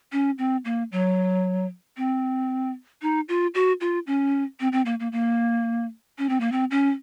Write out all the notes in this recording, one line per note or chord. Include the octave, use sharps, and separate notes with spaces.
C#4
C4
A#3
F#3
C4
D#4
F4
F#4
F4
C#4
C4
C4
A#3
A#3
A#3
C#4
C4
A#3
C4
C#4